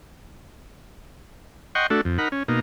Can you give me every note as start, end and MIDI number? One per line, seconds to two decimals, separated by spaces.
1.75 1.87 75
1.75 1.87 78
1.75 1.87 79
1.75 1.87 84
1.75 1.87 85
1.90 2.01 57
1.90 2.01 62
1.90 2.01 66
1.90 2.01 69
2.05 2.18 41
2.18 2.28 63
2.18 2.28 70
2.18 2.28 78
2.18 2.28 83
2.32 2.43 61
2.48 2.60 47
2.48 2.60 58
2.48 2.60 63